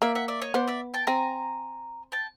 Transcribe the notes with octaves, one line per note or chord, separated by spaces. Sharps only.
A#3 D5 E5
E5 F#5
D5 E5
C#5 D#5
B3 C5 D5
D5 E5
G5 A5
C4 G#5 A#5
G5 A5